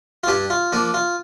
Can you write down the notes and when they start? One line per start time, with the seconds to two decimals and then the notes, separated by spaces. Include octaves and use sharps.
0.24 F4
0.28 G2 D4 G4
0.50 F4
0.72 F3 A#3 D4
0.94 F4